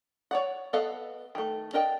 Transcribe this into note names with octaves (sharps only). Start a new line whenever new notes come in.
C#5 D5 F#5
B3 A4 B4 D#5 F5
D#3 A3
D4 A#4 D#5 G5